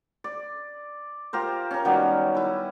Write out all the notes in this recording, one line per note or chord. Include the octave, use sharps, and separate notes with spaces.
D5
F4 G4 A#4 C5
C#4 A#4
D#3 F#3 G3 B3
E4 B4